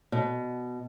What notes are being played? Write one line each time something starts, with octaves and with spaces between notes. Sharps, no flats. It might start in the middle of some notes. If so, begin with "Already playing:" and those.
B2